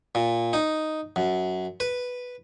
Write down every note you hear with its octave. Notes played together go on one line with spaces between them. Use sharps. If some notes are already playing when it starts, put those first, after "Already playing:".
A#2
D#4
F#2
B4